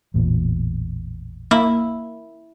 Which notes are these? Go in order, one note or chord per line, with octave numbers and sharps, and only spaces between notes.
A1 E2 A#2
A#3 E4